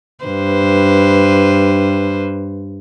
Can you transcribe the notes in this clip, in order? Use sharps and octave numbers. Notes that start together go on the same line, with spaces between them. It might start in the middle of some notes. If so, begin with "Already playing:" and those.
G2 B4 C5